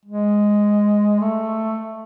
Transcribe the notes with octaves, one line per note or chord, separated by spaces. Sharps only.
G#3
A3